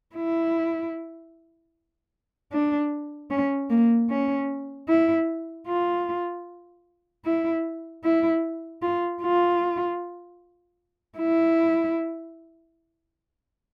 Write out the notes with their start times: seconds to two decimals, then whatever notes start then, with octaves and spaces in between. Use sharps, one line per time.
0.16 E4
2.52 D4
3.31 C#4
3.71 A#3
4.10 C#4
4.89 E4
5.67 F4
7.25 E4
8.04 E4
8.82 F4
9.22 F4
11.19 E4